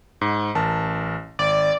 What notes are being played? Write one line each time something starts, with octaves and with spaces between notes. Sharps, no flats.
G#2
A1 A#4 A5
G#1 D5